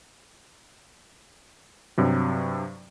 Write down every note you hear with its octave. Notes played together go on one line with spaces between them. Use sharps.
G2 C3 F#3